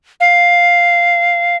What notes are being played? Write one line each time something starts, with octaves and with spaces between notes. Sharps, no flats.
F5